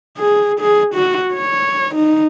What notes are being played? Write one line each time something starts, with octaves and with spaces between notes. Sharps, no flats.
G#4
G#4
F#4
C#5
D#4